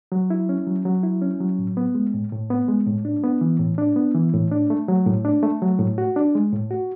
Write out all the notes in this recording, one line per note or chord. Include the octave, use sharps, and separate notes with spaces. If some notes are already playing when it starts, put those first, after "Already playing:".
F#3
E4
C#4
F#3
F#3
E4
C#4
F#3
A2
B3
G#3
A2
A2
B3
G#3
A2
D4
B3
E3
A2
D4
B3
E3
A2
D4
A3
F#3
A2
D4
A3
F#3
A2
F#4
D4
G#3
A2
F#4